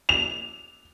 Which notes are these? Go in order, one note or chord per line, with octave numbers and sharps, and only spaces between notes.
F7